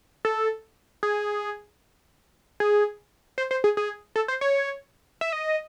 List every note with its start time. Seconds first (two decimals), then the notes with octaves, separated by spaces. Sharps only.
0.25 A4
1.03 G#4
2.60 G#4
3.38 C5
3.51 C5
3.64 G#4
3.77 G#4
4.16 A4
4.28 C5
4.41 C#5
5.21 E5
5.33 D#5